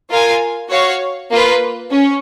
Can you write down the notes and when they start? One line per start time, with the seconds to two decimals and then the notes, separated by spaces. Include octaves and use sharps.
0.10 F4 A#4 F5 G#5
0.70 F#4 C#5 F5
1.30 A#3 F4 B4
1.91 C#4